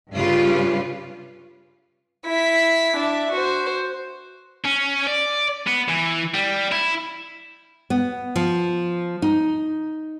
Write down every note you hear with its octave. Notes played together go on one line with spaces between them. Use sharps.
G2 C#3 G3 F4 B4
E4 B6
D4 E5
F#4 C5
C#4
D5
B3
E3
G3
E4
B3
F3
D#4